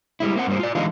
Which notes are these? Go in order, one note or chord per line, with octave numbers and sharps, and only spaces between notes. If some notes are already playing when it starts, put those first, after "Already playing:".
G3 G#3 E4
A#3 C4 F#5
G2 G3 A#3 C5
F4 D5
D3 E3 G#3 B3 D#4 F5